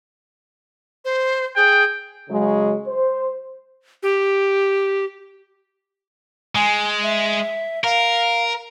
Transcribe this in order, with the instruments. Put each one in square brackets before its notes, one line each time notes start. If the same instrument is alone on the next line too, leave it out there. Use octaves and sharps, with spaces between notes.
[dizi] C5
[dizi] G#4 [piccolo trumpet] G5
[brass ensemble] C#3 F#3 G#3
C5
[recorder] G4
[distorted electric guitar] G#3 [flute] G#5
[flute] E5
[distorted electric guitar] A#4 [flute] F5